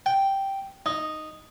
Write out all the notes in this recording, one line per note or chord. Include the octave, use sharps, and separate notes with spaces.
G5
D#4